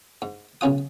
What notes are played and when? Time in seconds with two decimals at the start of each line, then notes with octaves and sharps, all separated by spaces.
0.22 G#2
0.61 B1 C#3 C#4 F4 D#6